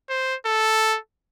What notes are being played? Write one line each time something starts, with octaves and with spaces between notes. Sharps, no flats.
C5
A4